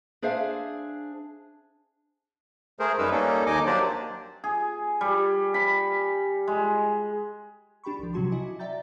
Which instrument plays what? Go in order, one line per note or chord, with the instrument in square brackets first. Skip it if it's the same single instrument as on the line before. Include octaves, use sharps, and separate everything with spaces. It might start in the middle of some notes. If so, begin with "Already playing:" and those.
[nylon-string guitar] D4 G#4 C5 E5 F5
[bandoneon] A3 G#4 A#4 C5
F#2 G3 D#4 A#4 B4 E6
G3 A#3 C#4 D#4 A4
D#2 D#4 D#5 G#5 D6
F#3 A#3 D4 G4 C5 D5
[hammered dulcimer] G#4
G3
B5
G#3
[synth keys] D4 G4 G5 B5 C#6
C2 F3
C3 F#3 C#4 F#4 A5 C6
E4 F#4 D#5 G#5 D6
D5 E5 G5 A#5 G6 A6